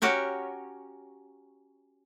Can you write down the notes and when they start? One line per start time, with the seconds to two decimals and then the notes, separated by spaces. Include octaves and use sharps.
0.02 C#4 F#4 G4 A#4